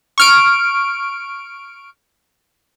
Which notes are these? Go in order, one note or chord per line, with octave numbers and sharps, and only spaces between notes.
C#6 F6 D7